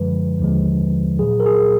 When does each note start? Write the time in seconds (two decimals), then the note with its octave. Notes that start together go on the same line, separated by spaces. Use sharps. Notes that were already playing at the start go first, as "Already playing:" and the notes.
Already playing: F#2 D3 F3 G#3 B4
0.39 D#2 D3 F3 G#3
1.19 A#2 F#3 G#4
1.40 A#4
1.46 G#4